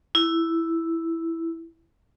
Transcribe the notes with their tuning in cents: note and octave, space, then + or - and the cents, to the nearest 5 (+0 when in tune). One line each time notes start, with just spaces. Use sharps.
E4 +0